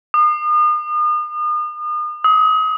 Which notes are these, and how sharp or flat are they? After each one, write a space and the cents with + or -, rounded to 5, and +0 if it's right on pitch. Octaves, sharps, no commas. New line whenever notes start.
D#6 -40
D#6 +35